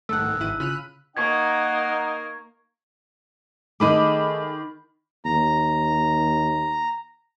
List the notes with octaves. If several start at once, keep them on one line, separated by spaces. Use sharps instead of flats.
B1 G#2 D#3 A3 A4 F#5 E6 F#6
E6
G#1 E4 D#7
C#3 F4 B5 F6 F#6 D#7
A#3 D#4 A#4 F#5 C#6 G#6
D#3 A3 G#4 D#5 B5 D6
D#2 A#5